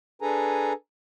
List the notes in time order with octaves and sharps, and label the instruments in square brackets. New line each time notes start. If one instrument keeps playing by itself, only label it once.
[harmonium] D4 G#4 A4 B4 G#5 A#5